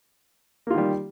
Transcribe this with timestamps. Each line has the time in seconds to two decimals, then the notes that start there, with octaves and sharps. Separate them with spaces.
0.67 A#3
0.70 F4
0.74 D#3
0.78 G3